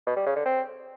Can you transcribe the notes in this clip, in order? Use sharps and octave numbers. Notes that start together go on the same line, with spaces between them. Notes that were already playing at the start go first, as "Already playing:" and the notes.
B2
G3
C#3
D3
C4